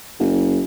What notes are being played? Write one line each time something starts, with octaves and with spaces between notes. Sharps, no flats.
F#1